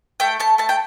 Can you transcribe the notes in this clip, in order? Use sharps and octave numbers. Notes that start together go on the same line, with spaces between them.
A3 G5
A3 A5
A3 A5
G5